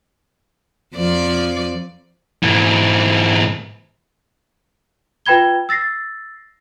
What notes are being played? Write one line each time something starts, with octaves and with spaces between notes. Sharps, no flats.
F2 F3 D5
G#2 E3
F4 B4 G5 B5 G#6 G7
E6 A6 A#6 C7